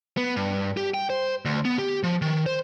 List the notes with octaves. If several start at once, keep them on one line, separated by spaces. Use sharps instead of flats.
B3
G2
G4
G5
C5
D2
B3
G4
F3
D#3
C5